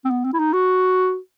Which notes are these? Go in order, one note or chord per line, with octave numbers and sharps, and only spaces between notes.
C4
B3
C4
E4
D#4
F#4